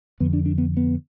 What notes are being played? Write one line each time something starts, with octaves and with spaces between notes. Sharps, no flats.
F2 D3 B3
D4
D4
B3
B3